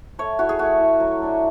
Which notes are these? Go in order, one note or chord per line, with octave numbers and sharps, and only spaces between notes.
A3 C#5
E4 F#4
G#4
A3 F#4
E4
F#3
A3 D4